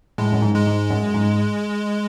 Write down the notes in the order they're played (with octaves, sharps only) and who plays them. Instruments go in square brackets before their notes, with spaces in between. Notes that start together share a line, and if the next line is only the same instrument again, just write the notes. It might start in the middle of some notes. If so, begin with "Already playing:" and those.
[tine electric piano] A2 [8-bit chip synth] G#3
[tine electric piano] F#2
G#2
[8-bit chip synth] G#3
[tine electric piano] G#2
F#2
G#2